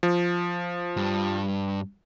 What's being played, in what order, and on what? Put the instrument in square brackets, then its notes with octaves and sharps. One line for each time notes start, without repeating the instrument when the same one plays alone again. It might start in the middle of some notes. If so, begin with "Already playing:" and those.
[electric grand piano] F3
[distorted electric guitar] G2